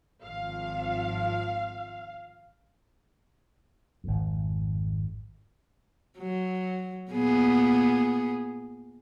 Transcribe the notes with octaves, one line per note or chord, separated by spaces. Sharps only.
G#1 F3 F5
G#1 F2
F#3
A#2 B3 G#4